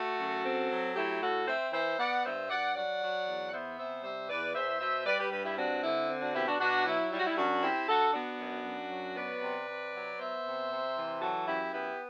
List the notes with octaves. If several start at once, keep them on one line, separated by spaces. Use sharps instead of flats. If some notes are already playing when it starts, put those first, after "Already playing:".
Already playing: A3 F#4 A4
F#2
C4
F#3
A3 E4 G4
A2 F#4 A4
C4 C5 E5
E3 C5 E5
B3 D5 F#5
G2 C5 E5
G2 D5 F#5
F#3 D5 F#5
F#3
E2
F#5
B3 C5 E5
C3 C5 E5
G3 C5 E5
E2 B4 D5
E2 C5 E5
B2 C5 E5
G3 B4 D5
G4 B4
G2 G4 B4
E4 G4
C4 D4 F#4
D3 E4
C4
D4 F#4
B2 E4 G4
D4 F#4
B2 D4 F#4
F#3 E4
G3 E4
F#4
E4
F#2 D4 F#4
C4 E4 G4
D3 F#4 A4
B3 D4 F#4
F#2
F#2
F#3
B3 B4 D5
C3
C3
F#3
B3 C5 E5
C3
C3
E3
F#3 F#4 A4
F#2 E4 G4
B3 E4 G4